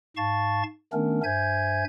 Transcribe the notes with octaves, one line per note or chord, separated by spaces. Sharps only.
G#2 F5 A5 C#6 A6
D#3 A3 B3 C#4 D4 A#4
G2 C5 E5 G#5 G6 G#6